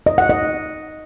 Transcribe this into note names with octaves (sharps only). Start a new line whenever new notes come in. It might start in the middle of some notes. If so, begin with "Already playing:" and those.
D#5
F#5
D#5